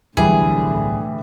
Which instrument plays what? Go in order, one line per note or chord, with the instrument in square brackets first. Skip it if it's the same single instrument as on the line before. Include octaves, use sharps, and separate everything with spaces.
[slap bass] D1 B1 A3 [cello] A2 D3 [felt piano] E3 G3 [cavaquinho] G#4